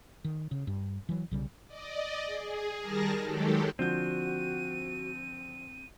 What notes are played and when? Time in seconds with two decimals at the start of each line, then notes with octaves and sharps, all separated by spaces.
0.25 D#3
0.51 C#3
0.67 G2
1.09 E3 F#3
1.31 B1 C#3 G3
1.67 D5 D#5
2.26 G#4
2.79 D#3 G3 G#4 A#4 A5 A#6
3.21 D#3 F#3 G#3 G4 A4
3.79 D3 F3 C4 F#4 G6 D#7